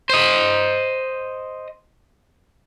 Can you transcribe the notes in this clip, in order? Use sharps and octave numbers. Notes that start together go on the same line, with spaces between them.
C5 D#5